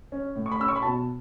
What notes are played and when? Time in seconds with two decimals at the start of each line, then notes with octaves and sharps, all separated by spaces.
0.12 C#4
0.36 A2
0.46 C#6
0.52 B5
0.60 C#4 E6
0.68 C#6
0.76 B5
0.82 B2 A5